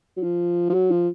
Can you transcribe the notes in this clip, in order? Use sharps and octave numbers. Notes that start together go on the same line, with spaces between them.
F#3
F3
F3
F#3
F3